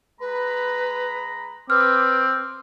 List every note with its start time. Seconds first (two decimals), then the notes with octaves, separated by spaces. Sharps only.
0.21 G#3 B4 A#5 B5
1.70 C4 B4 D6 F6